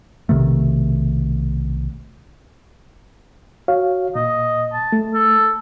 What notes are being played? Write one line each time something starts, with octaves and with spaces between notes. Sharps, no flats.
B1 C3 D#3 A3
F#4 C#5 F5
A#2 D#5
A5
A3
A4